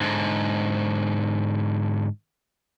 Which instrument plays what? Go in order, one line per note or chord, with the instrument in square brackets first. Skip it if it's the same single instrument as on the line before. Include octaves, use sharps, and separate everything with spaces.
[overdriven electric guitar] G#2 D3